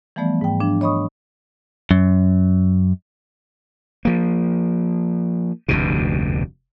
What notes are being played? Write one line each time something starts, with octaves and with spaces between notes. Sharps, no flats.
E3 F3 G3 A3 B3 D5
G#2 G5
F3 D4
C#5 D#5 B5 C#6 D#6
F#2
F3 A#3
F1 D2 G2 B2